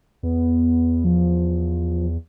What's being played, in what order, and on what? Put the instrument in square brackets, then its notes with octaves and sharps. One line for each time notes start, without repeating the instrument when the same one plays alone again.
[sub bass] E2 [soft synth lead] B3
[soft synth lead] F3